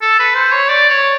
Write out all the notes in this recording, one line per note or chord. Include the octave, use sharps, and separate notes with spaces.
A4
B4
C5
C#5
D5
C#5